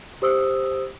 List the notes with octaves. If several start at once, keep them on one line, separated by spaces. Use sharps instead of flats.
G4 C5 D#6 E6